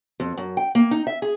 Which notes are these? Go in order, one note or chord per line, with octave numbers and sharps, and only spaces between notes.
F2
F#2
G5
A#3
D#4
E5
G#4